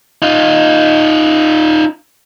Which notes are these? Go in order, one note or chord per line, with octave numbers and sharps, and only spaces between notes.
D#4 F4